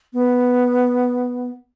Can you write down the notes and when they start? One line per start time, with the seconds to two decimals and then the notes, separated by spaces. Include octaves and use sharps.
0.13 B3